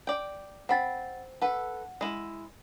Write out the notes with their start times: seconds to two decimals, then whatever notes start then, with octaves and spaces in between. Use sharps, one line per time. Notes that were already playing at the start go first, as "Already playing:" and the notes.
0.07 D5 G5
0.69 C4 F#5 G5 B5 A6
1.42 A4 B4 F#5
2.01 G#3 E4